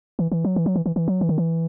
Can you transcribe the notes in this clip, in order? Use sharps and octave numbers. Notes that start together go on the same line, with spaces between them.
E3
E3
F#3
E3
F#3
E3
E3
E3
F#3
E3
D#3
E3